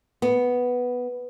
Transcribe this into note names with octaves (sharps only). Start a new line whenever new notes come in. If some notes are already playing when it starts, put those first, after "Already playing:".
B3